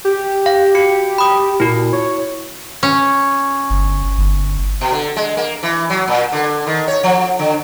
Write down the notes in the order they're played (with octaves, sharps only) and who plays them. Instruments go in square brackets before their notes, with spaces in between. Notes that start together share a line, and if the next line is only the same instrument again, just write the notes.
[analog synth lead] G4
[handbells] F5
F#4 C#7
B5 D#6
[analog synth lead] A#2 [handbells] E4 F#4
[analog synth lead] C#5
[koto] C#4
[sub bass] G1
G1
[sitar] B2
D3
G#3
A#3
E3
F#3
A#2
D3
D#3
C#5
F3
D3